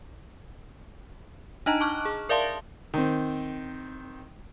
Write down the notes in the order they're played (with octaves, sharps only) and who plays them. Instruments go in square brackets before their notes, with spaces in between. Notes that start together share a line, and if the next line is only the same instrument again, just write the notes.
[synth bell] D4 D#4 D#5 A5 A#5
A5 C#6 D6 F6 F#6
G#4
A#4 D5 E5 F5 A5 C6
[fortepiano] D#3 C4